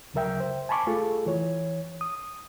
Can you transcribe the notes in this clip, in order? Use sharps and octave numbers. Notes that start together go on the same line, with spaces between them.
D2 C#3 F#3 A#4 E5 G5
C5
G#5 A5 B5 C#6 D6
A3 F4 G#4 A4
E3 C#5
D#6